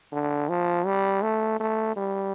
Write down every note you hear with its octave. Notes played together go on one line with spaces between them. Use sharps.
D3
F3
G3
A3
A3
G3